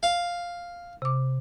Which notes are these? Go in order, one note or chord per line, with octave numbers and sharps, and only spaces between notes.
F5
C3 D6